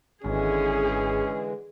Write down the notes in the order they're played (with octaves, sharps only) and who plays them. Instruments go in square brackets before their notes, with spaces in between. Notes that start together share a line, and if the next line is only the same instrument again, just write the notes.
[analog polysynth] G#1 [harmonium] D3 E3 G#3 [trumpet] C#4 [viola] G#4